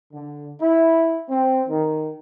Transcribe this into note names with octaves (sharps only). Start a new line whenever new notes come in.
D3
E4
C4
D#3